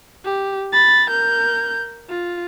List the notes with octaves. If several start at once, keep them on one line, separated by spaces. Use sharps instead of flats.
G4
B5 A6
A#4 G6
F4